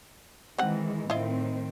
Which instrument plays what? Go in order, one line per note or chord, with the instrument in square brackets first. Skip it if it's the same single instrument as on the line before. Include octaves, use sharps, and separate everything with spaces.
[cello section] D#3 E3 G#3 [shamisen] C4 F#5
[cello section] A2 D#3 C4 [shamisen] E4 F4 D#5